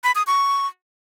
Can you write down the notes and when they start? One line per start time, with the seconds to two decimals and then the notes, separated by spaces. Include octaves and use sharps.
0.04 B5
0.15 D#6
0.27 C#6